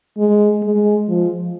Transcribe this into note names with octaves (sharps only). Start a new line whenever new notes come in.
G#3
G#3
F3